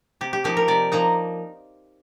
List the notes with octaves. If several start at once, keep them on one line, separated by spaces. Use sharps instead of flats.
C3 G4
G4
F3 A#3 D#4 G4
A#4
C3 D5
F3 A#3 D#4 A#5